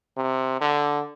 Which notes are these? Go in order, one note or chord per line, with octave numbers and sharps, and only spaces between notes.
C3
D3